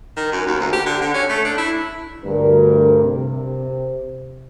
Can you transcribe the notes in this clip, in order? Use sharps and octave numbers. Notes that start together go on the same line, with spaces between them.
D#3
F#2
D#2
D2
G4
D3
D3
C#4
A3
D4
E4
D2 G2 A#4
C3